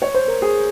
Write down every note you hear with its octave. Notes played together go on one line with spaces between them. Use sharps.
C#5
C5
A#4
G#4